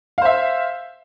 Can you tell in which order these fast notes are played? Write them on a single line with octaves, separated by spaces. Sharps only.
F5 C5 E5